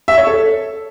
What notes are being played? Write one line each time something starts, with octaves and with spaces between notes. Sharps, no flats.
E5
C#5
A4